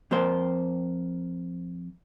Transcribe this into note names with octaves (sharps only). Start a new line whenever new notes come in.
F2 A#3 C5